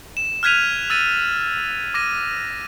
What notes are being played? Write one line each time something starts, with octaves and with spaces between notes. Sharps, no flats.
E7
F6 F#6 G#6 B6 D#7 F7
E6 A6 D#7
D6 A#6 D#7